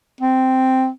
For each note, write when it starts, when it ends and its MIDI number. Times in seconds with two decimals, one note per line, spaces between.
0.21 0.89 60